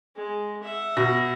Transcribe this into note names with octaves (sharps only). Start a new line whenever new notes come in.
G#3
E5 F#5
B2 A#6